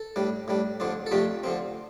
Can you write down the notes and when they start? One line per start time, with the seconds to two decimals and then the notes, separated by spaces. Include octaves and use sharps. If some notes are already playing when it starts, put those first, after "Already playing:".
Already playing: A4
0.16 A2 G3 D4
0.48 A2 G3 D4
0.80 F2 D3 F3 D4
1.06 A4
1.11 F2 C3 F3 A3 D4 G4
1.44 D3 F3 C4